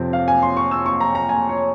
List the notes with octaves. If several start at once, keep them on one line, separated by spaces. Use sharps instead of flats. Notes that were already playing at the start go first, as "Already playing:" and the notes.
Already playing: F2 C3 F3 C4
F5
G#5
C6
C#6
E6
C#6
A#5
A#5
G#5
C#5